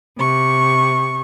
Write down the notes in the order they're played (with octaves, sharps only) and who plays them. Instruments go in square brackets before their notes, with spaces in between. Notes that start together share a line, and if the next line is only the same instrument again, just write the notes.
[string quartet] C3 C#6